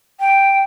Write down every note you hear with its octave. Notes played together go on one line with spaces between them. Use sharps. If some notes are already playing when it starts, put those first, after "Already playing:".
G5